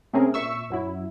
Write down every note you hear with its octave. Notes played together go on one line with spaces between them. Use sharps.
C3 A3 C4 C#4 G#4 A#4
A#2 E5 C#6 E6
F#2 F#3 E4